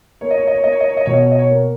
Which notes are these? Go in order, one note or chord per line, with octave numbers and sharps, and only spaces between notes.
A#3 C#5
D#5
C#5
D#5
C#5
A#3 D#5
C#5
D#5
C#5
D#5
B2 C#5
D#5
C#5
D#5
C#5
A#3